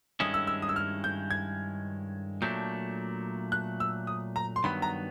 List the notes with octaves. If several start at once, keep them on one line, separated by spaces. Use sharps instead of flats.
G2 D#3 G#3 C#4 E4 D#6
E6
E6
D#6
E6
F6
G6
G#6
A#2 F#3 A3 D4 G6
F#6
E6
D#6
A#5
C6
G2 D#3 F#3 B3 B5
A#5